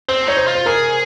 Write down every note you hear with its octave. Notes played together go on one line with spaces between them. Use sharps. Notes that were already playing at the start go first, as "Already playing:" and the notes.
C4 C5
D#4 C#5
C5
F4
C5
G#4 A#4